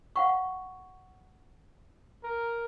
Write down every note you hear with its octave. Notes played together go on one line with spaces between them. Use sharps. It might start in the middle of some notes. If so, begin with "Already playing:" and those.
F5 F#5 C#6
A#4